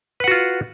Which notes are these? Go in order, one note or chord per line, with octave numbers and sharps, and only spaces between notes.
F4 F#4 B4 F#5